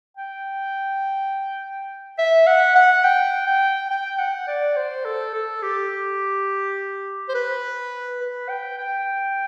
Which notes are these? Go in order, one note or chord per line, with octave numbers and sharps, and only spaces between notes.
G5
E5
F#5
F#5
G5
G5
G5
F#5
D5
C5
A4
A4
G4
C5
B4
B4
G5
G5